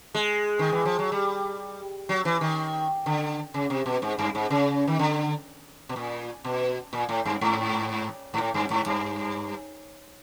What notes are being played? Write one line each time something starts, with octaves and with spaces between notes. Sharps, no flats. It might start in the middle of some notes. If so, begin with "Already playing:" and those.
G#3
D#3
E3
F3
F#3
G3
F#3
E3
D#3
D3
C#3
C3
B2
G#2
G2
G#2
C#3
D#3
D3
B2
A#2
B2
A#2
A2
G2
G#2
G#2
A2
G2
G#2
G2